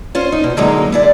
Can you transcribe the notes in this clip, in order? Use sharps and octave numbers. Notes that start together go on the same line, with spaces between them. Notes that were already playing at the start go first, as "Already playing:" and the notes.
C#4 F4 C5
D#4
B2
D3 F#3 G#3 A#3 D#4 F#4
E4 G#4 D5